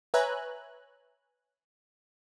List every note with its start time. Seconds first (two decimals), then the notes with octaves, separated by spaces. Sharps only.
0.14 B4 C#5 E5 G#5 A#5 F#6